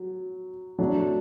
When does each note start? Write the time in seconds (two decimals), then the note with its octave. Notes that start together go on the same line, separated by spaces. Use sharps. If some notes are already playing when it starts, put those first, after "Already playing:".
Already playing: F#3
0.79 F#3 A3 D4